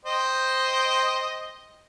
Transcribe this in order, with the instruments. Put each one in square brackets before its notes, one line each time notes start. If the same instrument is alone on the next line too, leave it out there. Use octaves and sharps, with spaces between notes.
[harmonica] C5 D#5 G5